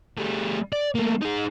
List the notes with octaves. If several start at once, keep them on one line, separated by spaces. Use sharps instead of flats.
G3 A3
D5
A3 A#3
D#4 G#4